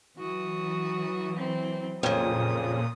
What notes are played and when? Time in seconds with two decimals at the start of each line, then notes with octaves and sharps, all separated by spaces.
0.18 E3 F#3 F#4 D#6
1.36 C4
2.03 F2 A#2 C#3 D#6